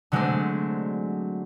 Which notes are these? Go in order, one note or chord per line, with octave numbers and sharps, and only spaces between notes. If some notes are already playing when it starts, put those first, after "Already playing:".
D3 F#3 G#3 A3 C4 D4